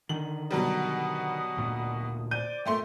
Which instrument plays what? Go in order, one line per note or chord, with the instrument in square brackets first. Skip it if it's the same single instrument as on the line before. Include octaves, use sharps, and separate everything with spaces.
[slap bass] D3 D#3 [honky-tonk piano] F#7
[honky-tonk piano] B2 F#3 G3 [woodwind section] F#5 D#6
[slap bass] D2 A#2
[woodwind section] C5 D5 D6 [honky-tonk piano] G6 D#7
[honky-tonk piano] A#2 A3 C6 [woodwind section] E5 G5